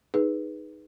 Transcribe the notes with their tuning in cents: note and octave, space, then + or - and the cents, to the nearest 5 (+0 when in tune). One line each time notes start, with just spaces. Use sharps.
D#4 +0 G#4 +0 B4 +0